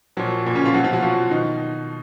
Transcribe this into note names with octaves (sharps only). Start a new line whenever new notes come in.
A#2 F3 F#3
A#2 A#3
C#3 C#4
F3 F4
B2 F#3 F#4
F3 F4
F#3 F#4
F3 F4
B2 D#3 D#4